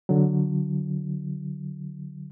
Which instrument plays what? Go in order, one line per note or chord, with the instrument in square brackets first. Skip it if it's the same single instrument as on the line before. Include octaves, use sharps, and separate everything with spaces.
[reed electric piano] D3 F#3